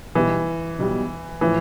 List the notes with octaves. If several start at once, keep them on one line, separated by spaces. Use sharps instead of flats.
B1 B2 E3 G3
B1 B2 G3
A2 E3 F3